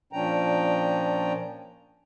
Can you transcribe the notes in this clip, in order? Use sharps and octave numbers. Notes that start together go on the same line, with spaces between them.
A#2 F3 C#4 D4 G5 A#5